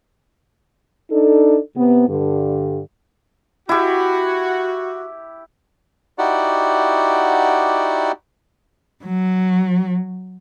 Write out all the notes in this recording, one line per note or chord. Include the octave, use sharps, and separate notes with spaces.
D4 D#4 A4
C3 B3
G2 D3
E4 F#4 G4
D#4 E4 F#4 G4 D5 F#5
F#3